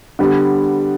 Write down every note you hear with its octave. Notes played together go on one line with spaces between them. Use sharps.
D3 G3 B3